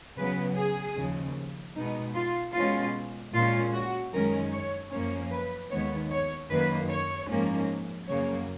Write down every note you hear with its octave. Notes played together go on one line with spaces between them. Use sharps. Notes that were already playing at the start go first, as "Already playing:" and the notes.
C#3 F#3 B3 B4
G#4
D#2 C#3 F3
B2 G#3 B3 D#4
F4
B2 G#3 C#4 F4
A#2 G#3 C#4 F4
F#4
F#2 D#3 G#3 C#4 A#4
C#5
F#2 F3 A#3 C#4 C#5
B4
D#2 D#3 G#3 B3 C#5
C#5
F#2 D#3 A#3 B4
C#5
G#2 F3 A#3 C#4
F#2 C#3 F#3 A#3 C#5